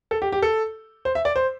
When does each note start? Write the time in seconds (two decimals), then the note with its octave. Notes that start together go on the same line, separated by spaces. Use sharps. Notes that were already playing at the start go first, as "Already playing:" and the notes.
0.11 A4
0.22 G4
0.32 G4
0.42 A4
1.05 C5
1.15 E5
1.25 D5
1.36 C5